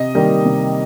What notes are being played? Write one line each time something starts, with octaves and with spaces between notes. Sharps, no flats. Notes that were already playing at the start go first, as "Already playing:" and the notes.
Already playing: C3 D#5
D#3 G3 A#3
C3